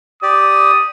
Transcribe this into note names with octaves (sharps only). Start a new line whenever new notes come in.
G4 D5 D#6